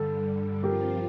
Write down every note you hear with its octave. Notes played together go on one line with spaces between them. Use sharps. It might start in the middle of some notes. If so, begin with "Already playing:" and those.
Already playing: G2 D3 G3 A4
G2 F3 C4 F4 G4 A#4